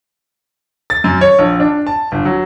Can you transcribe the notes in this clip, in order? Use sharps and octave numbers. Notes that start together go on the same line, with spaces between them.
A6
F#2
C#5
A#1
D4
A5
G1
F#3